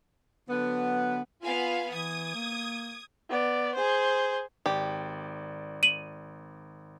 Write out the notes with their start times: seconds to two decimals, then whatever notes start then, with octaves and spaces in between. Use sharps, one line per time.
0.49 D3 F#3 B3
1.42 B3 F4 F5 G#5
1.91 E3 D#6 G#6
2.35 A#3
3.30 B3 D5
3.75 G#4 C5
4.66 G#1 G4 D5
5.83 D#7 F#7